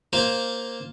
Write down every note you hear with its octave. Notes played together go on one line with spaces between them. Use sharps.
A#3 F4 C5